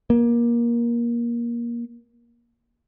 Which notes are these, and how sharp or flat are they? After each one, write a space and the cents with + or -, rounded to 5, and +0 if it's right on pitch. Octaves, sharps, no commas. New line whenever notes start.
A#3 +20